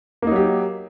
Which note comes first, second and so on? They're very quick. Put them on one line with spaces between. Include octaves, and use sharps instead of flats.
A#3 D#4 F#3 G4